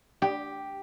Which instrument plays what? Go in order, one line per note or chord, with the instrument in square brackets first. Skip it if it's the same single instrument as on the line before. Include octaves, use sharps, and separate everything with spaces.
[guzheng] G4